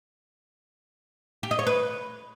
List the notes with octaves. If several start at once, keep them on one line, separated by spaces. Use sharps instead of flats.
G4
D#5
C#5
B4